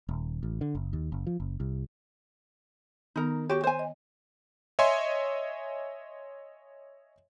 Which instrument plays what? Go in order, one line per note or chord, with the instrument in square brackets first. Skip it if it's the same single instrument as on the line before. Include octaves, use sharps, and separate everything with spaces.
[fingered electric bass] D#1
A1
D3
F#1
D#2
F#1
F3
F#1
C2
[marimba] D#3 B3 [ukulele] D#4 A#4
[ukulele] F#4 G4 [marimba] C#5
[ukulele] C5 G#5
[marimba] D#5
[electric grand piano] C#5 D#5 E5 G#5 C6